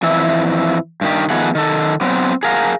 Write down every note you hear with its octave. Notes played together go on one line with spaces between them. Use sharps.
F2 E3 E5
G2 D#3 G4
D#3 F3 A3 B3 G#4 F#5
D#3 A4
F#3 B3 C4
G#4 A#4 F5 F#5